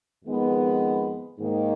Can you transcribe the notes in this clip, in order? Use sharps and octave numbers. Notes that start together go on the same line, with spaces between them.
F2 D#3 G#3 B3
G#2 D#3 A#3